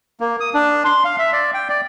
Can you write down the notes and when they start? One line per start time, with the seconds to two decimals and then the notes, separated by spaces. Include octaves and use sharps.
0.21 A#3
0.40 D#6
0.54 D4
0.85 C6
1.05 F5
1.19 E5
1.33 D5
1.54 G5
1.69 D5